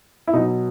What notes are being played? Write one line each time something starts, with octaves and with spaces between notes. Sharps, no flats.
E4
B2 F#3 D#4